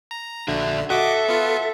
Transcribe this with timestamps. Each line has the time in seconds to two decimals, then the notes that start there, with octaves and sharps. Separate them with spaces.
0.11 A#5
0.48 A#1 D3 D4 F#4 E5
0.90 F#4 A4 D#5 E5 D6
1.28 B3 F4